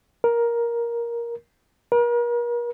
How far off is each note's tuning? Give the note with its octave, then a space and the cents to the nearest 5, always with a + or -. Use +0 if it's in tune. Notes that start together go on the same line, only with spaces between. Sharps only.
A#4 +10
A#4 +40